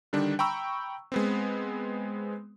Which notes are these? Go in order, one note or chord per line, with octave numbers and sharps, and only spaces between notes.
D3 D#3 G3 D4
G5 A#5 B5 C#6 E6
G#3 B3 C4